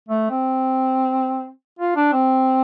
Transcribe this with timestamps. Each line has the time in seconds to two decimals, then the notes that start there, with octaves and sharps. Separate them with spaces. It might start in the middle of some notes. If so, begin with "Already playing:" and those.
0.09 A3
0.31 C4
1.79 F4
1.96 D4
2.13 C4